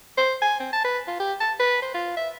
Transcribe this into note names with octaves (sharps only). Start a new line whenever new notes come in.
C5
G#5
C4
A5
B4
F4
G4
A5
B4
C5
F4
E5